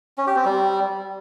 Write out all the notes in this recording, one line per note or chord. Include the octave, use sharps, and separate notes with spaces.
C#4
G4
C4
G3